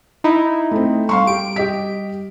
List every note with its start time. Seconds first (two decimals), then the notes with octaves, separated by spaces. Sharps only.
0.24 D#4 E4
0.71 A3 C4
1.09 G3 F5 C6 C#6
1.27 G4 D7
1.56 G4 D#5 B6